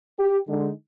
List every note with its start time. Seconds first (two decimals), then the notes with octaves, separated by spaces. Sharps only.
0.19 G4
0.49 D3 G#3 D#4